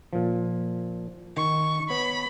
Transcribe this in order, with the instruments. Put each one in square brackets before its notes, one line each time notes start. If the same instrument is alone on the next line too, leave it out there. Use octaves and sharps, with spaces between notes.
[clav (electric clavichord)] A#2 F3
[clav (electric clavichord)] D#3 [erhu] C#6
[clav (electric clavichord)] B3 C#5 [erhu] B5